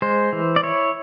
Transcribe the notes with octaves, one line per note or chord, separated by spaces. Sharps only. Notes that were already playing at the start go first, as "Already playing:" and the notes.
G#3 C5
E3
D5
E4 C#5